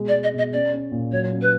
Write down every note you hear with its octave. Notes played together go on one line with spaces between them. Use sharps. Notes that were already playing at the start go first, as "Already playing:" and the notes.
Already playing: B2 G#3
D5
G#3
D#5
B2 D#5
C#4 D5
C#4
A#2
F#3 C#5
C#4
B4